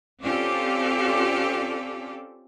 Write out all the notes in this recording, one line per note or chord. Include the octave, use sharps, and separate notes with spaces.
C4 C#4 F4 G4 A4 D5